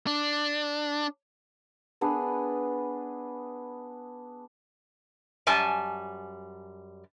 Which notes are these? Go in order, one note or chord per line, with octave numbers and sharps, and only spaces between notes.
D4
B3 D4 G#4 B4
F#2 G3 G#5 A5